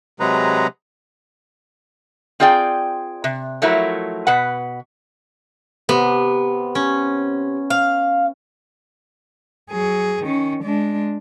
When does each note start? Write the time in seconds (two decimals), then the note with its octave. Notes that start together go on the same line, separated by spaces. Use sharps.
0.20 C3 F#3 G#3 G#4 B4 A#5
2.40 C4 F4 G#4 D5 G5
3.24 C3
3.62 F3 F#3 A3 E4 A#4
4.27 B2 B4 F#5
5.89 C3 B3
6.75 C#4
7.70 F5
9.71 F#3 G#4
10.24 D#3 C#4
10.64 G#3 D4